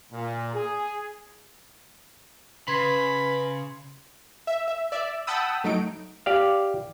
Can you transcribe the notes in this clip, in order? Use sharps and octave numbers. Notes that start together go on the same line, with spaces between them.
A#2
G#4
C#3 B4 B5 C6 G#6 C7
E5
E5
D5 E5
F#5 G5 A5 B5 D#6 E6
A2 F#3 D#4 D7
G4 D5 F5